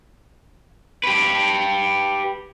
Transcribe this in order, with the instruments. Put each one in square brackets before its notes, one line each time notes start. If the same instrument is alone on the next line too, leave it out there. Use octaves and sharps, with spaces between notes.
[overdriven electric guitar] G4 B4